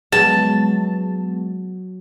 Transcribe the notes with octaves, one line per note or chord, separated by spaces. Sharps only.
F#3 G#3 B3 A5